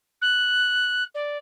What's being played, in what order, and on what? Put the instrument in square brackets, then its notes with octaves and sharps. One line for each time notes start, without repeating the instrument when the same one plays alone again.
[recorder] F#6
D5